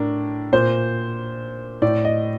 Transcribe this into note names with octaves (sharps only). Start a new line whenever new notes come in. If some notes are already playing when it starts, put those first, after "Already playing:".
Already playing: A2 D4 A#4
A#2 C5
A2 D5
D#5